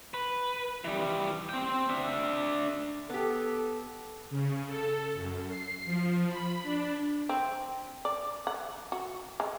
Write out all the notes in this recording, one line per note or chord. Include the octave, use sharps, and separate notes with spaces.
B4
E3 G3
C4 G5
D4 E5
B3 G4 A4
C#3
A4
F#2
C7
F3
B5
D4
C4
D5
F#5
F#4
G#3